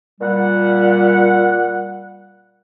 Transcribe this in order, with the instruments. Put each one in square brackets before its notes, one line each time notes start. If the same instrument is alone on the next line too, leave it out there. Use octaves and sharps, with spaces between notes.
[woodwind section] A#2 G3 F#5